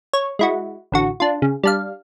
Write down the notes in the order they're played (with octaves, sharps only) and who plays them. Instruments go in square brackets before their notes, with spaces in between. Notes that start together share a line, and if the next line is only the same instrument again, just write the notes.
[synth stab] C#5
G#3 E4 F#4
A1 D3 F#4
D4 F4
C#3
G3 D4 F5